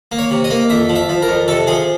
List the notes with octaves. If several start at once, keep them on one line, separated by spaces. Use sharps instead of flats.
A#3
C#5
C3
D#5
A#3
F2 E5
F3
E5
F3
A#4
F2
C3 A4
F3 G#4